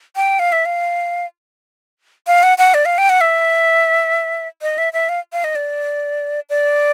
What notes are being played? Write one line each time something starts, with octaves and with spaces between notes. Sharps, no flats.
G5
F5
E5
F5
F5
F#5
F#5
D5
F5
G5
F#5
E5
D#5
E5
E5
F5
F5
D#5
D5
D5